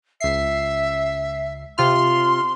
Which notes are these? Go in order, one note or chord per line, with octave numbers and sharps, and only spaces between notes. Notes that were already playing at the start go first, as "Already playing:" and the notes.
C#2 E5 C7
C3 F4 C6 F6